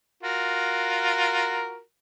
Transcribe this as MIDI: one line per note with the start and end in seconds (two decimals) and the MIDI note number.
0.23 1.80 65
0.23 1.80 66
0.23 1.80 70